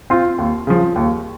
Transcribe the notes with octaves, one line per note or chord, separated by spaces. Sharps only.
C4 F4
D#2
C#3 F3
D#2